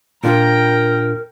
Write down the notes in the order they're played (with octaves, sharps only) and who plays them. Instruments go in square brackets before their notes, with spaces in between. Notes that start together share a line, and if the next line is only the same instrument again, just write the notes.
[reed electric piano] A#2 D4 F4 [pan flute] A#4 [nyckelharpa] G5 A#5